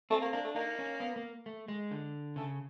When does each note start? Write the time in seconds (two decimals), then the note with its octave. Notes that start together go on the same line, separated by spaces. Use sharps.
0.10 A3 C4
0.22 A#3
0.33 A#3 D4
0.45 A3
0.55 A#3 D#4
0.79 C#4
1.00 B3
1.16 A#3
1.46 A3
1.68 G#3
1.91 D3
2.36 C#3 A3